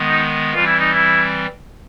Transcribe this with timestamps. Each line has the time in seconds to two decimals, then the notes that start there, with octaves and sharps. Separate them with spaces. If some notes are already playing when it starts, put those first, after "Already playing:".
Already playing: D#3 G#3 B3
0.08 D#4
0.54 E3 G3 C4 F4
0.66 E4
0.80 D#4
0.93 E4